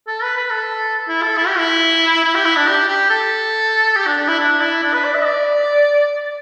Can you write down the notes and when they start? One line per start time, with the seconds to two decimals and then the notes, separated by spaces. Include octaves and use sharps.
0.07 A4
0.22 B4
0.36 B4
0.50 A4
1.08 E4
1.22 A4
1.37 E4
1.47 G4
1.58 E4
2.24 E4
2.35 G4
2.45 E4
2.56 D4
2.67 G4
2.88 G4
3.10 A4
3.96 G4
4.06 D4
4.17 D4
4.28 E4
4.39 D4
4.60 E4
4.82 D4
4.93 B4
5.04 D5
5.14 E5
5.25 D5